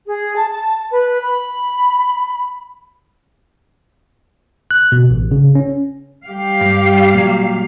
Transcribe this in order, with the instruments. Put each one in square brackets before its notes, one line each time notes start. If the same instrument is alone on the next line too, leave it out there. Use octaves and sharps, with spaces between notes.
[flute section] G#4
A5
A5
B4
B5
[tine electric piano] F#6
B2
A1
C#3
C#4
[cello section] G3 G4 F5
[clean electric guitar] G2
A#2 F#3